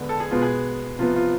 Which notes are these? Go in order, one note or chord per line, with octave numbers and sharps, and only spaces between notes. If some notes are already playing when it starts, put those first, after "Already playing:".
Already playing: D3 G#3 B3
A4
G#4
B2 G#3 B3 F4
G#4
C3 F3 B3 F4
F4